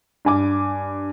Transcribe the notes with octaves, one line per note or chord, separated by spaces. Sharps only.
G2 G#5 D6